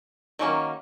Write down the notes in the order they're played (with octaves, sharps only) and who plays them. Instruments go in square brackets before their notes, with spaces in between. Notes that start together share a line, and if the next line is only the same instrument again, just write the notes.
[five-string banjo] D#3 F#3 A#3 C#4